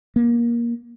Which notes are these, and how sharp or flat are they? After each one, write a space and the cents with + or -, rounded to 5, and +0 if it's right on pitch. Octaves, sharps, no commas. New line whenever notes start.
A#3 +20